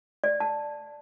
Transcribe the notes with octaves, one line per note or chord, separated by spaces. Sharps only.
D5
A5